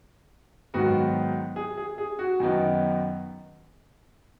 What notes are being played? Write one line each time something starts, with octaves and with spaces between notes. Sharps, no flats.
G#2 D#3 F#3 B3 F#4
G#4
G#4
G#4
F#4
F#2 D#3 B3 D#4